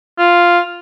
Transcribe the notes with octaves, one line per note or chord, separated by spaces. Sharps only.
F4